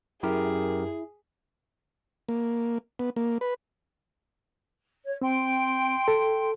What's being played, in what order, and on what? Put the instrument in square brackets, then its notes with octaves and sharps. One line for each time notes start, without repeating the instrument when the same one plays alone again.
[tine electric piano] F#2 G4 A#4 [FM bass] E4 [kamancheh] G#4
[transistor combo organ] A#3
B3
A#3
B4
[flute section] C#5
[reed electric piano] C4 [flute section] G5 C6
[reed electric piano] A4